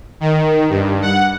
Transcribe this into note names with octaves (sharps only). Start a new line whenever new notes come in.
D#3
G2
F#5